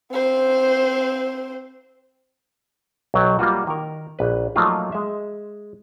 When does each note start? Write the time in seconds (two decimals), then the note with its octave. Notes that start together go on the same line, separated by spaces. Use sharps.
0.12 C4 C5
3.14 B1 F#3 G5
3.39 G3 A#3 F4 F#4
3.67 D#3 A#4
4.19 A#1 B4
4.56 F3 F#3 A3 A#3 D#4 F4
4.92 G#3 E5